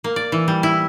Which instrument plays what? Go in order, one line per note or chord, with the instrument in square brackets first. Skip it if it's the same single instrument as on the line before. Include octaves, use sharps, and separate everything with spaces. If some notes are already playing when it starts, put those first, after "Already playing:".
[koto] A#3
D5
E3
G3
E4